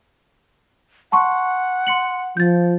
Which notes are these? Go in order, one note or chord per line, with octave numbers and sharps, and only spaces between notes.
F#5 A5 C6 C#6
C6 C#7 F#7
F3 G6 A6